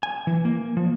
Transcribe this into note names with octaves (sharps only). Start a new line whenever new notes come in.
G#5
E3
A#3
F3